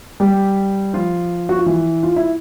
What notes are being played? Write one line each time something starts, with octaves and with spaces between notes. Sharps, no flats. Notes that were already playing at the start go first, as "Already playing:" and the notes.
G3 G4
F3 F4
F#4
F4
E3 E4
F4
E4